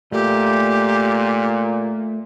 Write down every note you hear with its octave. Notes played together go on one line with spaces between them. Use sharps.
A#2 A3 G4